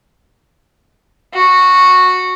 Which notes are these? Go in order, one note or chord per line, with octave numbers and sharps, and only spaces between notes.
F#4